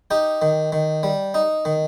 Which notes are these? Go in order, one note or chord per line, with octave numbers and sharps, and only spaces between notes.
D#4 G4
D#3
D#3
G3
D#4
D#3